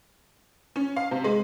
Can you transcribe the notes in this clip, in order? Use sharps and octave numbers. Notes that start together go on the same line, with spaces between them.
C#4
F5
C3
G#3